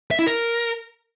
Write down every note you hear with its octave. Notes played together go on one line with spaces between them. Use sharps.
E5
E4
A#4